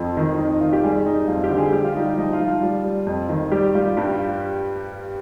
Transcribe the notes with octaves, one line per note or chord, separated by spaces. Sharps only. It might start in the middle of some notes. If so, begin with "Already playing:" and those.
Already playing: F2 F3
D#3
F2 D#4
D#4
D#3 F4
G4
G3 G#4
G3 D#4
F2 F4
G4
D3
G#4
G3 G4
F4
G3 D#4
F4
F3 D#4
F4
F3
F4
G3
G3
F2
D#3
G3 G4
G3 F4
G2 G4
F4